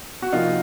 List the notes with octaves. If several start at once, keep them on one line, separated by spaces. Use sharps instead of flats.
F#4
C3 F3 A#3 D#4 F4